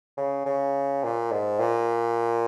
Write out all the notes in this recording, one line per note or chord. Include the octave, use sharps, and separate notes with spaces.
C#3
C#3
A#2
G#2
A#2